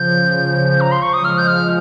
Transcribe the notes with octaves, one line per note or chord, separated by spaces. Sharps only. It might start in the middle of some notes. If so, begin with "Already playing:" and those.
Already playing: C#3 F3 G6
A#5
C6
C#6
D#6
F3 G#3 F6
G6
F6